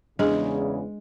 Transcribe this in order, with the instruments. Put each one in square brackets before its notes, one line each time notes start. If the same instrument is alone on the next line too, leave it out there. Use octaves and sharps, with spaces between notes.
[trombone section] E2 C#3 [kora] G#3 [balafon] D4 G#4